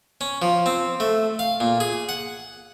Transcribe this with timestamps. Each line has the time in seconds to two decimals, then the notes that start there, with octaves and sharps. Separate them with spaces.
0.21 C#4
0.42 F3
0.66 C4
1.00 A3
1.39 F5
1.60 A#2
1.80 G#4
2.09 F#5